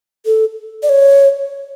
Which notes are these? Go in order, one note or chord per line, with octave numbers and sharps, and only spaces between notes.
A4
D5
C#5